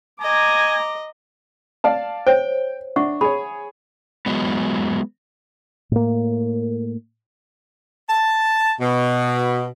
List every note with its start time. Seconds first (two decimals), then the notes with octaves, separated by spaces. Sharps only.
0.22 D#5 G#5 A#5 D6
1.84 D5 F5 A5
2.27 C5 C#5 G5
2.96 D4 E5 F#5 C#6
3.21 G#4 C#5 B5
4.26 F#3 G#3 B3
5.91 A2 A#3
8.10 A5
8.81 B2